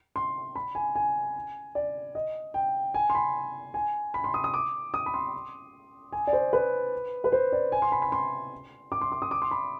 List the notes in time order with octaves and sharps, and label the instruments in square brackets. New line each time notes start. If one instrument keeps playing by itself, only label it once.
[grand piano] C6
B5
G#5
G#5
D5
D#5
G5
G#5
C6
B5
G#5
B5
C6
D#6
D#6
D6
D#6
B5
C6
G#5
D5
C5
B4
B4
C5
D5
G#5
C6
B5
B5
C6
D6
C6
D6
D#6
D6
C6
B5